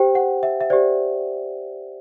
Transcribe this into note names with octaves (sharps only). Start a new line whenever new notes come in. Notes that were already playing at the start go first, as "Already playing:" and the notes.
Already playing: G4 C5 G5
F#5
E5
E5
G4 C5 D5